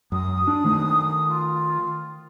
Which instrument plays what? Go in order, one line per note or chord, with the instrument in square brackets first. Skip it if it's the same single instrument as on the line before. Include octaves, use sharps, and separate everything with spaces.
[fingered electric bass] F#2 [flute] D#6
[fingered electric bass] D4
D#3 A3
[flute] F4